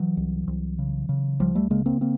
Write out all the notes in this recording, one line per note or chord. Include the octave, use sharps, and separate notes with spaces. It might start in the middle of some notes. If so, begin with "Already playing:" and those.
Already playing: E3 F#3
C2
C2
C#3
C#3
C#2 F3 G3
G3 A3
C#3 G#3 A#3
A#3 C4
A#3 C4